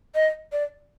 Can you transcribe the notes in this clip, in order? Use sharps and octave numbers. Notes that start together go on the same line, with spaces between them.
D#5
D5